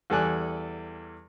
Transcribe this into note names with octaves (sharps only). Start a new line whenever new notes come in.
E2 G3 A4 D5 G#5 F#6